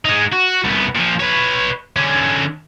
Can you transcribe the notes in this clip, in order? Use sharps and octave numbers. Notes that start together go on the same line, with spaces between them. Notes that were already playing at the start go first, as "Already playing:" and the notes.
G#3 D#4
F#4
C2 B3
A#2 F3
B4 C#5
D3 C#4